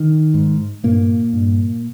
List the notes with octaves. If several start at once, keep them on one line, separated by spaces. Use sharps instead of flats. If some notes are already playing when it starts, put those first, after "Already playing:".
Already playing: D#3
G#2
G2 A#2 A#3
G2